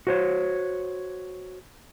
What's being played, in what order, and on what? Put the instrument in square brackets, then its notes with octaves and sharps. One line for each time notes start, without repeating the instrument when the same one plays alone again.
[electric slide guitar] F#4 C5 C#5